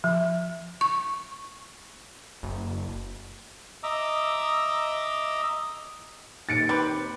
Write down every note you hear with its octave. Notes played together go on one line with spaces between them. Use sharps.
F3
C#6
F#1
D#5 E5 A#5 D6 E6
D#2 A6 C#7 D7
C4 G4 B4